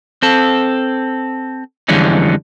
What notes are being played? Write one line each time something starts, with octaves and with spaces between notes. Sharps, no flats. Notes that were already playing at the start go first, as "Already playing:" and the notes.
C4 A4
F2 D3 E3 G3 G#3 C#4